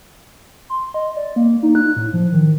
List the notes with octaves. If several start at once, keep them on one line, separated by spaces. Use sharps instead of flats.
C6
D#5
D5
A#3
D#4
F#6
A2
F3
D#3